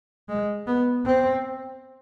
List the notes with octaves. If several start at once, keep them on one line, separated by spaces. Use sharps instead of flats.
G#3
B3
C4